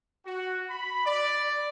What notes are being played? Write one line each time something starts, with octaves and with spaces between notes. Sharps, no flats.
F#4
B5
D5